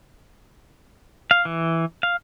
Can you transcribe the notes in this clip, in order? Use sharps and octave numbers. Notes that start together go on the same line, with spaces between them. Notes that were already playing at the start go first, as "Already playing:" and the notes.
F5
E3
F5